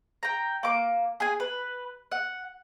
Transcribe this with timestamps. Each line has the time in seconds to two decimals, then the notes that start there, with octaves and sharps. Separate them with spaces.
0.23 G5 A#5
0.63 A#3 D6
1.20 G#4 G#5
1.40 B4
2.12 F#5